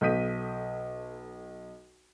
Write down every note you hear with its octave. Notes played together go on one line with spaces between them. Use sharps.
B1 A4 D#6 G6 B6 D#7